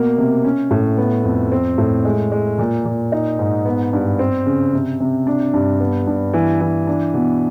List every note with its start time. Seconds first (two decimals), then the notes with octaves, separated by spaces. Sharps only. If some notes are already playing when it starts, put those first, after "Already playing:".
Already playing: B2 A#3
0.18 C3
0.44 C#4
0.71 A2
0.97 B3
1.24 F2
1.52 C4
1.78 A2
2.05 G#3
2.32 G#3
2.59 A#2
2.85 A#2
3.12 D#4
3.39 G#2
3.65 B3
3.93 G2
4.19 C4
4.46 C#3
4.73 C3
5.00 C3
5.27 D4
5.54 G2
5.80 B3
6.07 G2
6.33 E3
6.61 E3
6.87 D4
7.14 B2